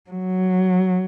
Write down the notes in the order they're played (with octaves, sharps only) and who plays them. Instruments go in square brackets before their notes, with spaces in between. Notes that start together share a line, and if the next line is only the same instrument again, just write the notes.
[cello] F#3